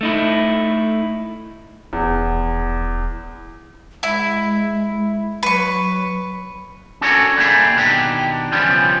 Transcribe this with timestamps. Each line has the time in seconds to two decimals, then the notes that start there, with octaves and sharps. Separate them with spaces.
0.01 A3 D#4 E4
1.93 D#1 E2
4.03 G#3 E4
5.43 F#3 B4 C#6
7.01 C#4 D4 F#4 A4 A#4 C#5
7.37 D3 G3 A#3 G#4 E5
7.75 B2 D#3 D4 G4
8.52 C#3 E3 F3 G3 B3 C#4